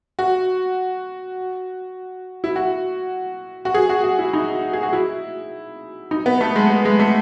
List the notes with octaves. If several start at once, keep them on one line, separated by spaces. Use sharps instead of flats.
F#4
E4
F#4
F#4
G#4
F#4
F#4
E4
D#4
G#4
F#4
E4
D#4
B3
A3
G#3
A3
G#3
A3